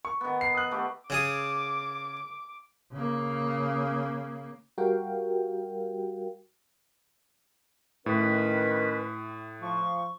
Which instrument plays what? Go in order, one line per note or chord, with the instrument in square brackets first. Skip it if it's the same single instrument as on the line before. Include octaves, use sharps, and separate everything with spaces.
[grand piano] C#6
[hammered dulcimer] D#3 B3
[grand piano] C7
D#6 F#6
[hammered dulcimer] A3 B3 G4
[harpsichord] C#3 G#4 D#6 [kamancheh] D6
[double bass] C#3 A#3
[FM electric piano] G3 F#4 G4 A#4 F5 G5
[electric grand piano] A2 [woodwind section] D#3 C#4 B4
[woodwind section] F3 C#6